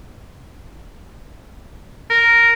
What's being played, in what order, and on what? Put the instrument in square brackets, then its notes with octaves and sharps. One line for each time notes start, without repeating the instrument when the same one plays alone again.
[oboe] A#4